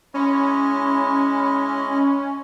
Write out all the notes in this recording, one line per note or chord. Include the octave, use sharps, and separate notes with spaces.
G#3 C#4 E4 D#5